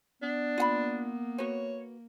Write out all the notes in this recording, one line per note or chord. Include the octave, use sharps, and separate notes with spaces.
B3 D4
A#3 F4 F#5 B5
F#4 B4 C#5